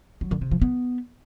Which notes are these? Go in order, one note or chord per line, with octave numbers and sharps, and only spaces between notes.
F#3
D3
C3
F3
B3